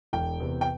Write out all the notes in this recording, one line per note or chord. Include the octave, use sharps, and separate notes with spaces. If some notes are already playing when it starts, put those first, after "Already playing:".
E1 G5
E2 C3
G5